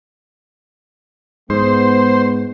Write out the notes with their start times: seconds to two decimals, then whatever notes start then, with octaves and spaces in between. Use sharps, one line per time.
1.50 G#2 G#3 B3 C5